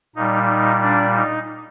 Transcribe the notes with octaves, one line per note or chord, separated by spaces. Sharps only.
A#2 G3 D#4
D#4
D4
D#4